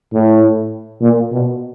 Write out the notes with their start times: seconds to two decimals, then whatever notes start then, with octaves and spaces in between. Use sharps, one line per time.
0.13 A2
1.01 A#2
1.31 B2